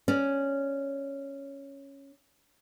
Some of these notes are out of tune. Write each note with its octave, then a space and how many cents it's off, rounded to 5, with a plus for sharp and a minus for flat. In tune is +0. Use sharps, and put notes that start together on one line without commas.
C#4 +0 D5 +0